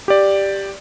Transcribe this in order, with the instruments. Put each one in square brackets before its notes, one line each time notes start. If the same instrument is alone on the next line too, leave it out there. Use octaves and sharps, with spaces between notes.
[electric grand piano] G4 D5